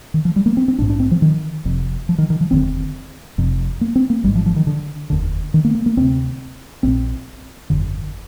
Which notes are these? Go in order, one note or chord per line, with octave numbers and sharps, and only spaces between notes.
D#3
F3
G3
A#3
C4
C4
A#1 G#2 D4
D4
C4
F3
D#3
F1 F2 C3
F3
D#3
D#3
F3
F1 D#2 D3 C4
F1 F2 C3
A#3
C4
A#3
G#1 G#2 G3
F3
F3
D#3
D3
F1 D#2 D3
D#3
A#3
A#3
A#3
D2 C3 C4
A#1 A#2 C4
G1 F2 D3